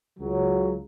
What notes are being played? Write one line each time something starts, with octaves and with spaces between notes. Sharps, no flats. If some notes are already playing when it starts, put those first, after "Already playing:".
C#2 C#3 F#3